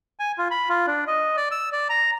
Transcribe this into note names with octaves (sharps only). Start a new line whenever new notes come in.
G#5
F4
B5
F4
D4
D#5
D5
E6
D5
A#5